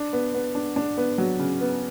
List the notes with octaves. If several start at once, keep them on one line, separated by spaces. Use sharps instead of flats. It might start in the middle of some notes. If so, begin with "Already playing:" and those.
Already playing: D4
B3
B3
D4
D4
B3
F#3
C#3
B3